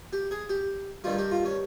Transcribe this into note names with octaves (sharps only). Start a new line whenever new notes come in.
G4
G#4
G4
G2 D#3 G3 F4
G4
F4
C#4